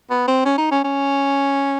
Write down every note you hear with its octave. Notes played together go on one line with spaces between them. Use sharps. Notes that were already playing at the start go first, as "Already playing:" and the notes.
B3
C4
C#4
D#4
C#4
C#4